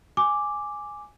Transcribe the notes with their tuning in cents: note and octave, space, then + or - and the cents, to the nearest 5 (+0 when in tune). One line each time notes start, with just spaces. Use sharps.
G#5 +0 D6 +0